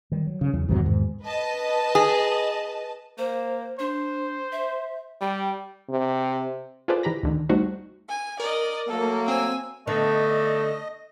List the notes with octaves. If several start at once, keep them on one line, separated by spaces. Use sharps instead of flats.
D#3 G3
F#3
C#3
E2 F#3
E2 G#2 C3 D#3 F#3
G#2
B4 D#5 A5
G#4
A#3 C5
D4 C5
E5
G3 G5
C3
F4 G#4 A4 B4 C5 D5
E3 G4 A#5 B5 A#6
D2 D3 D#3
G3 A3 D#4 F#4 C5
G#5
A#4 D5 D#5
F#3 A3 A#3 A4
C4 G#5 E6
D3 A3 B3 A4 D5 D#5